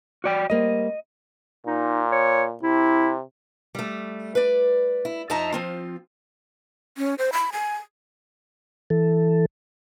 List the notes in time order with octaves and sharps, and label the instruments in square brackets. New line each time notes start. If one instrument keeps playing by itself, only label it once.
[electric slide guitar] F#4 D5 G5
[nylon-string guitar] G3 A#3 C4 [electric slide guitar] D#5
[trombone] A#2 [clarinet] D#4
[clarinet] C#5
[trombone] C3 [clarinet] E4
[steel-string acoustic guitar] G3 A3
B4 D5
E4
F2 D#4 D#5 E5 A5 A#5
F3 C4 F4
[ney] C#4
C5
B5
G#5
[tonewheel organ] E3 A4